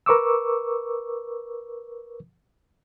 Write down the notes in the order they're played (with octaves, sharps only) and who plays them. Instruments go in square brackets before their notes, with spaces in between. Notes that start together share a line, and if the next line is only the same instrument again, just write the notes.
[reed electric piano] A#4 B4 C#6 D6 E6